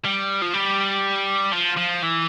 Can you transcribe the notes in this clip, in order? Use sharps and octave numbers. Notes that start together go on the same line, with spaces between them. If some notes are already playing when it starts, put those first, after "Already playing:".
G3
F3
G3
F3
F3
E3